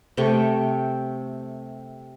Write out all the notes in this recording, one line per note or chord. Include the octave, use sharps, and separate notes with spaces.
C3 A3 G5 C#6